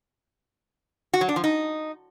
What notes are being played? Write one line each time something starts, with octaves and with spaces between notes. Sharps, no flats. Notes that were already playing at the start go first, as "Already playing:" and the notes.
F#4
F#3
D4
F3
D#4